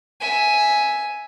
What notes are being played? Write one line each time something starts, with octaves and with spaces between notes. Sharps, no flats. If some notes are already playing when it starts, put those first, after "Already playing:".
E5 G#5